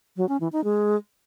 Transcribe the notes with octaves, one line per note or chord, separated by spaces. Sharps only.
F#3
C#4
E3
D#4
G#3